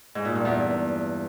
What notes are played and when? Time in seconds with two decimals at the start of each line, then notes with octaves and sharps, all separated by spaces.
0.15 G#2
0.25 A#2
0.35 G2
0.45 E2